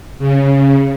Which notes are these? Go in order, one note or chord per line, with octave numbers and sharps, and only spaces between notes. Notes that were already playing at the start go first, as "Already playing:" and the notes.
C#3